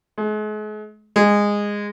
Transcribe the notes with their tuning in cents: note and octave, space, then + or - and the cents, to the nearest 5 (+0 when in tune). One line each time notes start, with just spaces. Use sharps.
G#3 +40
G#3 -15